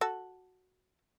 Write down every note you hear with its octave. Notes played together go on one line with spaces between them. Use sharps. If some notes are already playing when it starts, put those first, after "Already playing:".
F#4 A4